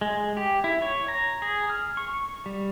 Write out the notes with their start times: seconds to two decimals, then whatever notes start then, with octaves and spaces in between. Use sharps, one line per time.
0.01 G#3
0.37 G4
0.64 E4
0.82 C#5
1.08 A#5
1.42 G#4
1.70 F6
1.97 C#6
2.46 G3